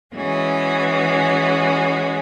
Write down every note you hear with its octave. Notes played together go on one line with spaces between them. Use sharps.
E3 G#3 C#4 F#4